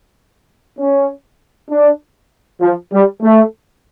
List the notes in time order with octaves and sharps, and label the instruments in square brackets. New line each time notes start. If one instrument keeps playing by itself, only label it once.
[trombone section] C#4
D4
F3
G3
A3